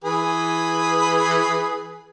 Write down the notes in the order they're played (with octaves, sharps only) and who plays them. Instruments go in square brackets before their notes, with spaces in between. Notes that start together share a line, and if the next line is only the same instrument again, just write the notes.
[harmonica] E3 G#4 B4